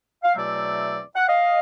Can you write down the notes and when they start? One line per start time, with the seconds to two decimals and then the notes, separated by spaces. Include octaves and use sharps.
0.24 F5
0.35 E2 B2 F#3 A3 C4 D5 E5
1.16 F#5
1.28 D#5 F5